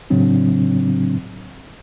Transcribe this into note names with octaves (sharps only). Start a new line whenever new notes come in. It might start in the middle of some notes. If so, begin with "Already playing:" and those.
A2 C#3 F#3 C4 D4